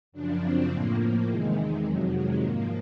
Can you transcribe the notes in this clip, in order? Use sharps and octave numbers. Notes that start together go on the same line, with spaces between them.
F#2 C#3 F3 D4
C4
A2 F3 A#3
A#3
E2 C3 D#3 G#3
F2 C3 D#3 F#3
G#3
G#2 F3 A#3